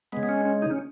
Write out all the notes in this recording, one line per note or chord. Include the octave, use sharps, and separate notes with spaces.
C#3 G#3 B3
B3
C#4
C#4
D#4
C#4